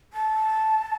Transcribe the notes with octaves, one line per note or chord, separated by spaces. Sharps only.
A5